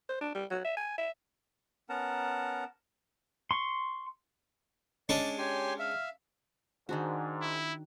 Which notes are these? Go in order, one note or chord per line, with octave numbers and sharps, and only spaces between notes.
C5
D4
G3
F#3
E5
G#5
E5
B3 C#4 A#4 F#5 A5 A#5
C6 C#6
G#3 C#4 D4 D5
G4 C#5 G#5 C6
E5 F5 F6
G#2 D#3 D4 F#4
E4